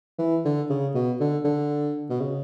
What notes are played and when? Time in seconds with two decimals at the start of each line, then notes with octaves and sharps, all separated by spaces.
0.19 E3
0.45 D3
0.70 C#3
0.94 B2
1.20 D3
1.45 D3
2.10 B2
2.20 C#3